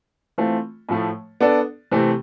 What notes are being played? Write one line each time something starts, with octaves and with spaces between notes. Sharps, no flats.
E3 A3 C4 F4
A2 F3 A3
B3 D4 A4 D5
C3 E3 A3 C4